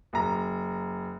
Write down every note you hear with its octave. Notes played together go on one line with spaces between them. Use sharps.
F#1 A#5